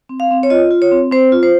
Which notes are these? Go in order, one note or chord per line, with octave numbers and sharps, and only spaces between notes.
C4
F5
C4
C#5
F4 D#5
F4
C#5
C4
C4 C5
F4
C5